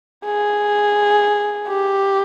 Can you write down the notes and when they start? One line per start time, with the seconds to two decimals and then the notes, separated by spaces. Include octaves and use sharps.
0.25 G#4
1.68 G4